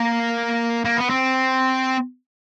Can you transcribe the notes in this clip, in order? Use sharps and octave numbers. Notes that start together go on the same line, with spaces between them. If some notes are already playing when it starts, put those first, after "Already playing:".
Already playing: A#3
A#3
B3
C4